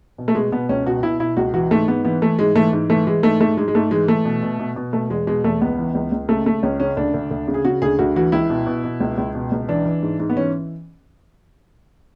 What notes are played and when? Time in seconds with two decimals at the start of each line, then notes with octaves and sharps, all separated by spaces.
0.18 B2
0.28 A3
0.35 B2 G#3
0.52 B2 B3
0.69 C#2 C#4
0.86 B2 F#4
1.03 B2 E4
1.20 B2 E4
1.37 C#2 F#4
1.54 E3 F#4
1.71 G#2 A3
1.88 G#2 B3
2.04 E3 B3
2.22 E3 A3
2.39 G#2 G#3
2.56 E3 A3
2.73 G#2
2.90 E3 A3
3.07 E3 G#3
3.23 G#2 A3
3.41 G#2 A3
3.57 G#2 G#3
3.68 G#3
3.75 G#2 A3
3.91 E3 G#3
4.08 E3 A3
4.25 B2
4.43 B2
4.59 B2
4.76 B2
4.93 B2 A3
5.10 E2 G#3
5.27 B2 G#3
5.44 E2 A3
5.61 C#2 B3
5.78 E3
5.95 C#2
6.12 C#2
6.29 C#3 A3
6.46 C#3 A3
6.63 C#2 C#4
6.80 C#3 C#4
6.97 D2 D4
7.14 D2
7.31 D2
7.48 C#3
7.54 G#4
7.65 C#3 F#4
7.82 D2 G#4
7.99 D2 F#4
8.16 E3 F#4
8.32 C#2 E4
8.50 B2
8.67 B2
8.84 B2
9.00 C#2
9.18 C#2
9.35 B2
9.52 C#2
9.69 E3 D4
9.85 E3
10.02 G#2
10.20 G#2
10.29 B3
10.36 E3 C#4